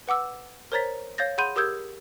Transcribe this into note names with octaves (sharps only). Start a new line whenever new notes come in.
B4 F#5 D6 E6
A#4 C5 C#5 A#5 A6 B6
C#5 F5 G6 A6 A#6
G#4 F#5 B5 C6 G6 D#7
G4 A#4 D#6 E6 G6 G#6